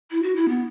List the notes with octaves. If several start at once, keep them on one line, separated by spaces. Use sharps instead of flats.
E4
F#4
E4
B3